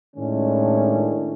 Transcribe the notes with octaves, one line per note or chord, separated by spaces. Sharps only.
A2 D#3 G#3 C#4 D4